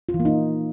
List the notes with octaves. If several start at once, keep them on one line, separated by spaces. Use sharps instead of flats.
F4
E3
A#3
D#4